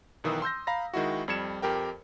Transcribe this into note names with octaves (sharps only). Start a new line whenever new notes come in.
B1 D#3 E3 D#6 E6
C6 E6 G6 A#6
F5 A#5 B5 A#6
D#3 G#3 E4 F#4
F2 G3 G#6 C#7 E7
F2 G4 A#4 G5